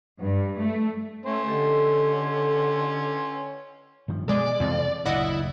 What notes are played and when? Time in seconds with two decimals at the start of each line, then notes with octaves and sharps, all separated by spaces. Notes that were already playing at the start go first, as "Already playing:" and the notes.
0.21 G2
0.59 A3
1.26 A3 C#4 C6
1.47 D3 G4 A4 D#5
4.08 G2 D#3 F3
4.29 B2 G#3 D5
4.60 F2 C3 E3 G#3
5.06 F#1 D2 A#2 E4 D5 D#5 F#5